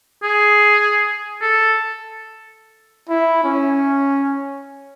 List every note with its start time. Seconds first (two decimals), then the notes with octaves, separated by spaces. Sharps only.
0.23 G#4
1.42 A4
3.09 E4
3.44 C#4